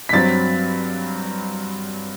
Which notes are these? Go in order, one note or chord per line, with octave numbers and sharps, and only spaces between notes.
B6
G2 F#3 C4 A6